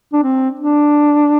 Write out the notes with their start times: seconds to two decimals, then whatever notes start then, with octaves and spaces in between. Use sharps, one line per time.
0.13 D4
0.23 C4
0.59 D4